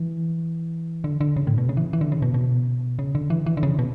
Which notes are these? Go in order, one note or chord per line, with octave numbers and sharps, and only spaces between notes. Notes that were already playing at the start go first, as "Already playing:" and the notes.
Already playing: E3
D3
D3
C#3
A2
B2
C#3
E3
E3
D3
C#3
B2
B2
C#3
D3
E3
E3
D3
C#3
B2